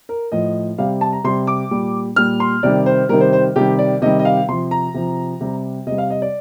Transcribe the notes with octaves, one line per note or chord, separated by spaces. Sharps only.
A#4
A2 F3 D#5
C3 G3 F5
A5
A#5
C3 G3 C6
D6
A#2 G3
A#2 G3 F6
C6
C3 D#3 G3 D5
C5
C3 D#3 G3 A#4
C5
C5
C3 D#3 G3 G4
D5
C3 D#3 G3 D#5
D#5
F5
C3 F3 C6
A#5
C3 F3
C3 G3
C3 D#5
G3
F5
D#5
D5